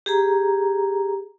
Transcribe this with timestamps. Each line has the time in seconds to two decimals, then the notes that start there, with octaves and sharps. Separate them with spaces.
0.06 G4 G#4 A#5